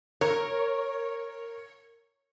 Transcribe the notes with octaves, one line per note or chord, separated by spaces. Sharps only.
A#4 C#5